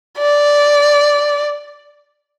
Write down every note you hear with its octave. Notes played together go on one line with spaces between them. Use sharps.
D5